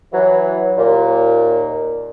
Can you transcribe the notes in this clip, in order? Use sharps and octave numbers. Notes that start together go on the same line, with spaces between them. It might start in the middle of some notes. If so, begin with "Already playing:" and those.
E3 F#3
D#2 A#2